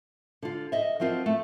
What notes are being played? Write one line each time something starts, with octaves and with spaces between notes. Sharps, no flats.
D3 F4
D#5 E5
F3 F#3 C4 F4 A#4
A3